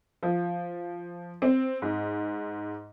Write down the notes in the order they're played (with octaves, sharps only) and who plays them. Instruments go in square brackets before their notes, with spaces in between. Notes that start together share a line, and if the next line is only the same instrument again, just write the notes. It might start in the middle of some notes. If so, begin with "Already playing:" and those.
[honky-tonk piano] F3
C4
G#2